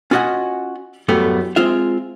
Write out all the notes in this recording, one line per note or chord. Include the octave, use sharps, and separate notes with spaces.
C#4 F4 F#4 D#5 F#5 G#5
F#2 A2 G3 A3 B3
G#3 C4 F4 E5